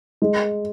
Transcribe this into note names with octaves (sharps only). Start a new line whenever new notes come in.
G#3